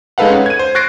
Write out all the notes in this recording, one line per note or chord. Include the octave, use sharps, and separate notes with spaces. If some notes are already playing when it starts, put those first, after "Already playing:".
G#3 D#4 A4 B4 F5 F#5
C#4
G#6 D#7
C5
C#6 F#6 A6 A#6 C7 D7